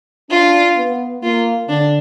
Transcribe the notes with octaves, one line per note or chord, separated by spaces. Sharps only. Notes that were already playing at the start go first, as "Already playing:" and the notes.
D4 F4
B3
A#3 F4
D3 D4